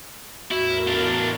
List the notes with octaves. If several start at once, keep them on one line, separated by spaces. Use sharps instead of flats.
E2 A2 E4 F#4 A#4
D4 F4